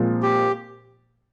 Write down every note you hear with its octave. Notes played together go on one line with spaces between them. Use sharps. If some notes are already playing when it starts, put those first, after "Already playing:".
Already playing: A#2 F3 G#3 C4
G4